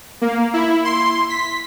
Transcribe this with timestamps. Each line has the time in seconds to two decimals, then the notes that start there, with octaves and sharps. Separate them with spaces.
0.21 A#3
0.54 E4
0.85 C6
1.30 B6